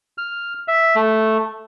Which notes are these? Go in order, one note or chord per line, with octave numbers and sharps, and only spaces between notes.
F6
E5
A3